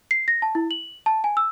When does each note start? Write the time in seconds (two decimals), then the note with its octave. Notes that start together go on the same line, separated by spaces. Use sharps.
0.11 C7
0.28 A#6
0.42 A5
0.55 E4
0.71 F#7
1.06 A5
1.24 G#5
1.37 E6